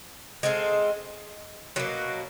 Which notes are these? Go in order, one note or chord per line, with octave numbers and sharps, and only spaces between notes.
G#3 C4 F4 A4
B2 F#3 A#3